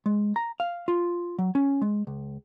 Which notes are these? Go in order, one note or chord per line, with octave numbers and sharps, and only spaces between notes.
G#3
A#5
F5
F4
F#3
C#4
G#3
C#2